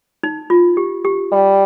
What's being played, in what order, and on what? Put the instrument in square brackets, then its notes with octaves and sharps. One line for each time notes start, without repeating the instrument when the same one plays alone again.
[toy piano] D#4
F4
G4
G4
[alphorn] G3